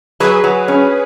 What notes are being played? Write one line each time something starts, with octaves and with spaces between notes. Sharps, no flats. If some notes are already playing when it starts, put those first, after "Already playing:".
F#3 G#4 B4
F#3
C#4